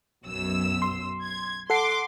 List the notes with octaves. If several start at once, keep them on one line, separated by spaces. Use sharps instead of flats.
B1 F#2 E6
C6
G#6
A4 F#5 C6 D6 C7